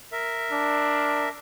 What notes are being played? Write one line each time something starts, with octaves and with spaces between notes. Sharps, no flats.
A#4 E5
D4